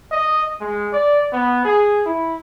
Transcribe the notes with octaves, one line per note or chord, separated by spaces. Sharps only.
D#5
G#3
D5
B3
G#4
E4